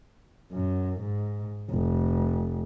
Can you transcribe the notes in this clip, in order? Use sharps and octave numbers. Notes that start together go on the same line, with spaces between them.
F#2
G#2
F1